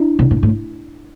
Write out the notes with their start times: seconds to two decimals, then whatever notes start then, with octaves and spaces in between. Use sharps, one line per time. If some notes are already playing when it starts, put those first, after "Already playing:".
Already playing: D4 E4
0.19 B2
0.31 A#2
0.43 A2